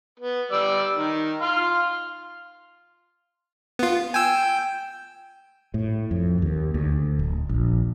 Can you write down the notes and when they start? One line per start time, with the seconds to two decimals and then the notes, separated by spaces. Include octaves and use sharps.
0.20 B3
0.51 G3 D5 E6
0.95 D#3
1.41 F5 C6 F6
3.79 B3 F4
4.14 G5 G#5 E6
5.74 A2
6.11 F2
6.42 D#2
6.74 D2
7.19 D1
7.49 A#1